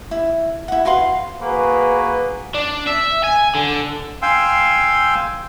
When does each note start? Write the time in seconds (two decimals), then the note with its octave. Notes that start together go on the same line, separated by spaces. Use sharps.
0.11 E4
0.68 E4 F#5
0.85 F#4 B4 F5 C6
1.42 A#3 F#4 G#4 B4
2.55 D4
2.87 E5
3.24 G#5
3.55 D3
4.22 F5 G5 G#5 C6 E6